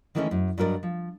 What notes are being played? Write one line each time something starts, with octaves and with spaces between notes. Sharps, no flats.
D#3 E3 G#3 A3 B3 C#4
F#2
G2 F#3 A#4 B4 D5 D#5
F3